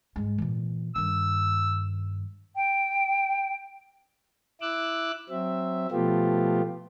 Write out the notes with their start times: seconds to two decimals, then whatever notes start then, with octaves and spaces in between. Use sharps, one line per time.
0.16 G#2 G#3
0.38 A#2 E3
0.95 G2 D#3 E6
2.56 G5
4.61 E4 D6 E6 F#6
5.30 F#3 C4 E5
5.91 B2 F3 A3 B3 F4 G4